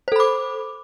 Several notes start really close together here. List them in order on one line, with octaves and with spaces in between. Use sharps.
C5 A4 B5 D6